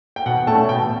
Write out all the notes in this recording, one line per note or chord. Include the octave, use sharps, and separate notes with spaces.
G5
B2 F#5
A3 C#4 A5
B2 G5